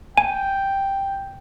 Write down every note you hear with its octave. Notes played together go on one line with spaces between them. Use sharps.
G5 G#5